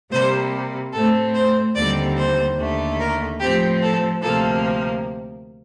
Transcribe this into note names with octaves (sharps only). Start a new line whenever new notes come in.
C3 G3 A#3 C5
A2 A3 C4 A4
C5
D#2 D3 G3 C4 D5
C5
D#2 D3 A3
A#4
A2 F3 C4 G4
A4
D2 C3 F3 A#3 A4